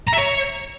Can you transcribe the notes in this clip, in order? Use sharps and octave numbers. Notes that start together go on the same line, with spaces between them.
A#5
E5
C#5